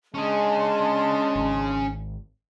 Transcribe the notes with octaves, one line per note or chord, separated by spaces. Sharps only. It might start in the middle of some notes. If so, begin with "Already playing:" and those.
G#3 C#4 D4 G#4 A5 C6
G#1